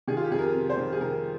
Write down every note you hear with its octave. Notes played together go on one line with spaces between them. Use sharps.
D#3 G#4
F4
G4
F2 G#4
A#4
C3
C5
D#3
G#4
D#3 A#4